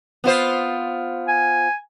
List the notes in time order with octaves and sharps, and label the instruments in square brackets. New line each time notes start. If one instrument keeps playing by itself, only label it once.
[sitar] B3 F4 C5
[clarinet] G#5